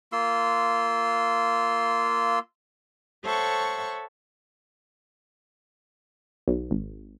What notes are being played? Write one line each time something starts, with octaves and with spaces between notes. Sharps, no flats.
A#3 F4 C6 E6
A4 C5 C#5 E5 F#5 C#6
B1
G#1